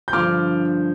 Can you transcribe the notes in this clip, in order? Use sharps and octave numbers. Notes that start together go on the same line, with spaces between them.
G6
G2 D3 F3 D6 F6